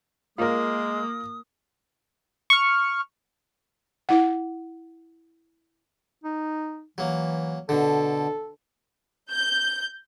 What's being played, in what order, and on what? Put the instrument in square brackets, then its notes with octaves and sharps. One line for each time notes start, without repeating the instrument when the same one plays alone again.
[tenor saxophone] G#3 [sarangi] A#3 [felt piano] F4 A#4 [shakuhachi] D#6
[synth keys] C#6 F6
[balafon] E4 F#5
[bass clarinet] D#4
[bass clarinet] E3 [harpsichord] F#3 A#3
[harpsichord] B2 D3 [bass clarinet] A4
[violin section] G6